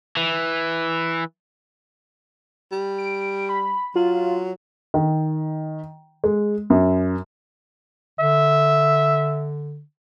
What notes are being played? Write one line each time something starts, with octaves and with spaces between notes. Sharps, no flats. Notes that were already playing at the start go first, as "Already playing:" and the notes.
E3
G3
D7
B5
F#3 F4
D#3
G#3
F#2
D3 E5